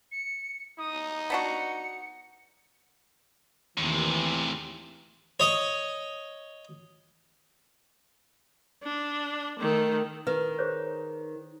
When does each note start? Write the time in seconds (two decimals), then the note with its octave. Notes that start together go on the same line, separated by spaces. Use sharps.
0.12 C#7
0.78 D#4 D#6
1.30 B3 D4 F#4 C#7
3.78 D#2 A2 C3 E3
5.40 C#5 D#5
8.83 D4
9.59 D#3 A3
10.27 D#3 B4
10.59 G#4 C5 C#5